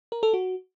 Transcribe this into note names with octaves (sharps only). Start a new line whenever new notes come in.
A#4
A4
F#4